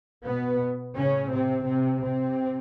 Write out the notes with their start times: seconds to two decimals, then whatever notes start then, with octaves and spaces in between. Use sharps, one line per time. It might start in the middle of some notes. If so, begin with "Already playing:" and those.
0.25 B2 B3
0.96 A2 C#3 C#4
1.32 C3 C4
1.67 C3 C4
2.03 C3 C4